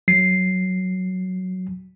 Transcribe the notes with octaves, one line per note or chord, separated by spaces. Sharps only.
F#3 C7